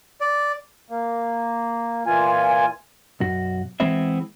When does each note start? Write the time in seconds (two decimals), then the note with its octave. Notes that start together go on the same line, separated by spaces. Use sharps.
0.21 D5
0.90 A#3
2.06 A#2 E3 F4 G#5
3.20 B1 F#2 F#4
3.80 E3 G#3 B3 C4 E4 E5